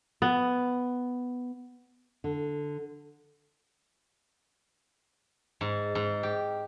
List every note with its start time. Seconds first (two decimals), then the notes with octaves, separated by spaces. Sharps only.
0.22 B3
2.24 D3
5.61 G#2
5.95 G#2
6.23 G4